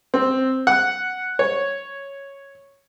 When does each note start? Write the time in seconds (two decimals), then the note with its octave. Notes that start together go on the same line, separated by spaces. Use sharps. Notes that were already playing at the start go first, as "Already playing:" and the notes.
0.14 C4
0.67 F#5
1.39 C#5